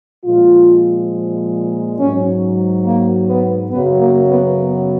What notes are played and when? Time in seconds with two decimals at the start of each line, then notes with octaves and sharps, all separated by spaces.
0.25 A#2 F3 G#3 F4
1.98 G#2 F#3 C#4
2.85 A#3
3.28 B3
3.71 F#2 C#3 F#3 B3
4.00 A#3
4.29 B3
4.58 B3